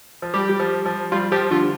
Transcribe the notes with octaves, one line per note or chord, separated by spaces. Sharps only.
F3
G3 G4
G3
F3
F3
G3 F4
F3 G4
D3 F4